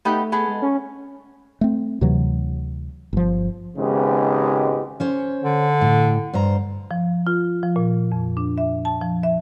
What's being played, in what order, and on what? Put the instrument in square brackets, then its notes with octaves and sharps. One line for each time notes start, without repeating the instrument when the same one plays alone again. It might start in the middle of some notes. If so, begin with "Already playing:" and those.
[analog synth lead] A3 [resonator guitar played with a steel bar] B3 D#4 G4
[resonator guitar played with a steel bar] B3 G#4 A4
[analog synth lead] G#3
C#4
[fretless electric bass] A3 C4
D2 C3 E3 F#3
G1 F3
[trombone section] G#1 G#2 C#3 G#3 B3 G4
[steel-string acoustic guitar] C#4 C5 C#5
[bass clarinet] D3
[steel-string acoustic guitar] A2
G2 C5 A#5
[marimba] F3
F4
F3
A#2
F2
D4
E5
A5
F3
E5